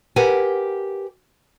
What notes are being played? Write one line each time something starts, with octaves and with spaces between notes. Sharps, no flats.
G4 A#4 B4 F#5 G#5